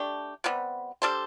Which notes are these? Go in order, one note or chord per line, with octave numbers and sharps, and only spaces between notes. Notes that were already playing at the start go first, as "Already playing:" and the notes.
Already playing: A3 D4 G4
C3 G3 B3
G3 D4 A4 C5